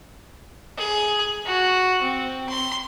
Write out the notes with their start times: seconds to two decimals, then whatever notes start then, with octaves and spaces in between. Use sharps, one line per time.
0.78 G#4
1.46 F#4
2.02 C4
2.49 C6